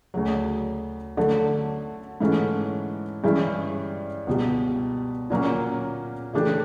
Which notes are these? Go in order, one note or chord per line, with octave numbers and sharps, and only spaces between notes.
D2 C#3 F#3
D3 F#3 A3
G#2 E3 A3 C#4
G2 E3 G#3 C#4 E4
C#2 B2 G3
A#2 F#3 A#3 C#4
C#3 E3 A3 D4 G4